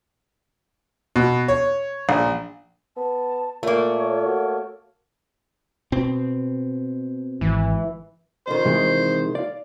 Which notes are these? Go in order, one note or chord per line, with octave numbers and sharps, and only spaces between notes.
B2
C#5
A#1
B3 A5
A#2 A3 A#3 C#5
F#4
B2 C4
G#1 E3
F2 D#3 C5
C3 E3 G#3
D5 F5